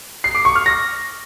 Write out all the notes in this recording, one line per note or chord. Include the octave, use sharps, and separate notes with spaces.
C7
D6
C#6
F6
A#6